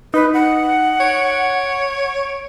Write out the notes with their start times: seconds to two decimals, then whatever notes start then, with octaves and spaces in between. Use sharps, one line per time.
0.14 D#4 B4
0.33 F#5
1.00 C#5 D7